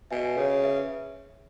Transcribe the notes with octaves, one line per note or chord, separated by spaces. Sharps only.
B2 E5 G#5
C#3 C#5
B4 E5